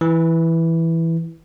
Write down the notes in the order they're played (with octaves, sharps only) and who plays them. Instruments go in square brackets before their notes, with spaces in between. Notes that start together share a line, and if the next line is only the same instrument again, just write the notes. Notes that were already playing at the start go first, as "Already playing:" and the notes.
[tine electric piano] E3